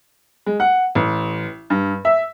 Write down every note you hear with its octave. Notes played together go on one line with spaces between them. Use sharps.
G#3
F#5
A1
G2
E5